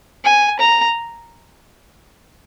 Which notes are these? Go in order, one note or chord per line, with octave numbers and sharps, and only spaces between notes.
G#5
A#5